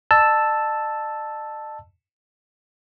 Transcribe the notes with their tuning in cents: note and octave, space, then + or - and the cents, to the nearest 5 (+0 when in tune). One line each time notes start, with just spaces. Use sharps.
D#5 -45 A5 +0 E6 +0